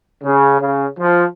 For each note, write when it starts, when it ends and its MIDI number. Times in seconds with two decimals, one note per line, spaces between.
0.24 0.58 49
0.61 0.87 49
1.00 1.25 53